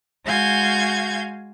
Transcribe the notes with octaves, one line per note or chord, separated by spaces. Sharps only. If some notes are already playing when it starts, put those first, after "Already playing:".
G#3 F#4 F5 G#5 G6 G#6